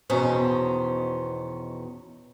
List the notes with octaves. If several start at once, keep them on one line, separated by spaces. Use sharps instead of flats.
E2 B2 D#3 C#4 C5